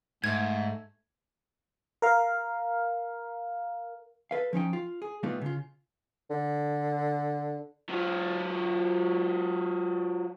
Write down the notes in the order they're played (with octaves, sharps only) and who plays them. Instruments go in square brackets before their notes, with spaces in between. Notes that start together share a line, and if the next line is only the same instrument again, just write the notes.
[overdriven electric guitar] G#2 [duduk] A3 [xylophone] G#6
[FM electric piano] A#4 F5
[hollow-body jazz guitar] A4 B4 F5
F3 C#4 D#4 G5
F4
G#4
B2 G3 A3 B3 D#4 F4
C#3 F4
[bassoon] D3
[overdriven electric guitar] F#3 F4